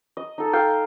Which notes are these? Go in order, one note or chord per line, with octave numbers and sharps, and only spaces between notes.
D#5
D#4 A4
A4 F5 G5